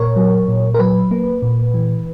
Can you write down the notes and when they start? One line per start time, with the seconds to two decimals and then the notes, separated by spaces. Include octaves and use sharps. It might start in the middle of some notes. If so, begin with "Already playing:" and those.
Already playing: A#2 A#4 C#5
0.16 F#3
0.48 A#2
0.74 A#4
0.79 F#3 B4
1.11 A#3
1.42 A#2
1.74 E3